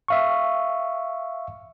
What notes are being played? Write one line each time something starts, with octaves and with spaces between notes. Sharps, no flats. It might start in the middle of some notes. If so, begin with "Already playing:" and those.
E5 F5 C#6